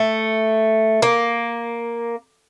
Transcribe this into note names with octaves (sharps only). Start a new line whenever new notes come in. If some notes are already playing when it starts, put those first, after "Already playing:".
Already playing: A3
A#3